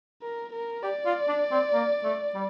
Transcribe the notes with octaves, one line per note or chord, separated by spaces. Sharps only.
A#4
A#4
G4 D5
F4
D4
C4
A#3
A3
G3